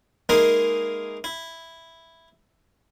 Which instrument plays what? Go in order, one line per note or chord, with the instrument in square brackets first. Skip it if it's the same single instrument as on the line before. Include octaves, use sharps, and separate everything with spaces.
[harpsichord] G#3 A#3 D#4 E4 A#4
E4